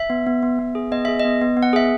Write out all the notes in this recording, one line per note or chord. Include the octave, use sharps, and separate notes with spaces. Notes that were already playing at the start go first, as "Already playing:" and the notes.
Already playing: E5
B3
B3
B3
B3
G#4
B3 D#5
G#4 E5
D#5
B3
B3
B3
F#5
G#4 E5